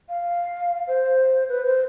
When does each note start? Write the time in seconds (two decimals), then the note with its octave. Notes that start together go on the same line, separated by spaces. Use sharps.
0.09 F5
0.88 C5
1.49 B4
1.65 C5